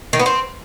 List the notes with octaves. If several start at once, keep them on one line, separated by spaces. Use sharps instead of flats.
D#3
B3
C4